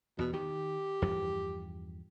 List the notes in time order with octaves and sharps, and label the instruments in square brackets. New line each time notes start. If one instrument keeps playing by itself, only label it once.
[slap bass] E2 [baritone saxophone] B2
[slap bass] D#3 [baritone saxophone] G4
[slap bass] E2 G2 F3